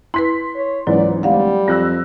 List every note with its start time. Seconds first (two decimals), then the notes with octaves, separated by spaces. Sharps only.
0.14 E4 B4 C6 B6
0.56 C#5
0.87 C#2 G#2 E3 F#3 C#4 D5
1.23 D1 G3 F5 F#5
1.68 F2 E6 F#6 A#6